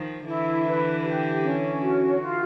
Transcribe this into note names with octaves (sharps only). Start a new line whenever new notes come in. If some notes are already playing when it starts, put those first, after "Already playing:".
Already playing: D#3 F3
D3 E3 E4
B4
G4
C#4
F#4
F4